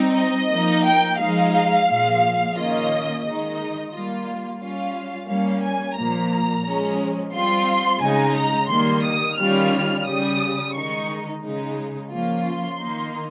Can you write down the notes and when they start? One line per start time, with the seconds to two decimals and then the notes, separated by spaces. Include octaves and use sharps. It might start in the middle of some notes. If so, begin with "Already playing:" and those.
Already playing: G3 C4 D#4
0.16 D#5
0.51 F3 A#3 D#4
0.85 G5
1.19 F3 G#3 D#4 F5
1.88 A#2 F3 G#3
2.55 D#3 A#3 C#4 F4 D#5
3.23 D#3 G#3 D#4 D#5
3.92 G3 A#3 F4
4.60 G3 C#4 F4 F5
5.28 G3 A#3 C#4 F5
5.62 G#5
5.96 A#2 F3 A#3 A#5
6.65 F3 G#3 C#4
7.33 G3 C4 F4 C6
8.01 C#3 G#3 D#4 G#5
8.36 A#5
8.69 D#3 G3 A#3 C6
9.03 D#6
9.38 D#3 G3 C#4 F4 F6
10.06 C#3 G3 C#4 D#6
10.74 D#3 G#3 D#4 C#6
11.43 C#3 G#3 D#4
12.11 F3 A#3 C#4 F4
12.45 C6
12.79 D#3 A#3 D#4